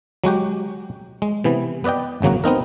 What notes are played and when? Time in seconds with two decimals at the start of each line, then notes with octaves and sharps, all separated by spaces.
0.24 F#3 G#3 F#4 G4
1.22 G#3
1.44 C3 E3 B3
1.84 B3 B4 D5 D#5 G5
2.22 G#1 C#3 F#3 A#3 F#4
2.44 B3 C4 D#4 A#4